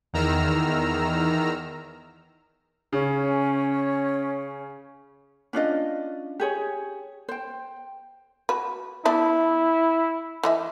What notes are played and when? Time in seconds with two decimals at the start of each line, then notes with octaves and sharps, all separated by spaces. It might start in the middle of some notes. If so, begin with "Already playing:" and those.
0.13 E2 D#3 A#5 E6 F6
2.93 C#3 C#4
5.53 C#4 D4 F4 D#5
6.40 G4 G#4 C#5
7.28 C5 G5
8.49 F#4 B4
9.05 B3 D4 E4 E5
10.43 E3 D#5 E5